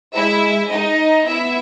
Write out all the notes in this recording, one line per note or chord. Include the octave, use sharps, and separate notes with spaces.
G#3 E4 E5
D#4 D#5
B3 E4 E5